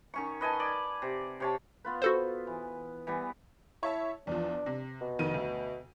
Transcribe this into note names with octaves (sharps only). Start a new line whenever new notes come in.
D#3 C#4 C#6
B4 D#5 G#5 A5
D5
C3
C3 C#5 A5
B3 F4 B4
F#4 A4 C5
E3
E3 G3 B3
E4 C#5 E5 A5
E2 F3 D4
C3
B2
F1 D#3 D#7
D2